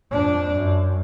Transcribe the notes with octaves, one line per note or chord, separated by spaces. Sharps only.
F2 D4
F#2